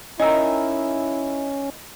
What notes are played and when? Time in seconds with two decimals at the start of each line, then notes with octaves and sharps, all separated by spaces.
0.20 C#4 D#4 E4 A#4 D#5 G#5 E6